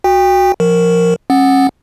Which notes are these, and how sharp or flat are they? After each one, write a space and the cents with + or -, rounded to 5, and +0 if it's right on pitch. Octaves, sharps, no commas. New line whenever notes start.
F#4 -5 G5 +30
F3 +0 A#4 -5
C#4 -35 F#5 +0